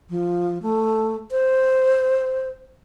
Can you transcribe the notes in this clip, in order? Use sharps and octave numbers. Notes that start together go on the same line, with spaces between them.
F3
A3
C5